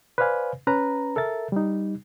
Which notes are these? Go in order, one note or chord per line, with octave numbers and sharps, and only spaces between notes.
B4 C5 D5 F5 G#5
C#4 B4 A#5
A4 A#4 E5 A6
G3 D#4